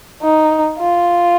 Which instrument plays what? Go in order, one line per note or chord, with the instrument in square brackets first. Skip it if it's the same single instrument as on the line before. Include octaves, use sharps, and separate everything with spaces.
[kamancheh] D#4
F4